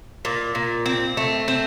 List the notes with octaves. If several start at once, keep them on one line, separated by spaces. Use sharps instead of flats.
A#2
A#2
C4
A3
C4